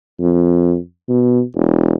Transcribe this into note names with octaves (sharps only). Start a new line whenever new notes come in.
F2
B2
E1